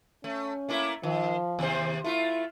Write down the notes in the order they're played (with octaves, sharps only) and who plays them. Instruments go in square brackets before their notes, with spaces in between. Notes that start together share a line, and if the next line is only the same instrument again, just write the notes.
[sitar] A3 [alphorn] C#4
[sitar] A3 A#3 E4
[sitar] D#3 [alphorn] F3
[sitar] D#2 C3 C5
[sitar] A3 F4 [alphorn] E4